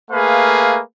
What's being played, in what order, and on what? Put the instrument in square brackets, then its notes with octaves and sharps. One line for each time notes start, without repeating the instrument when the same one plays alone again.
[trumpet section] A3 A#3 G#4 B4 F5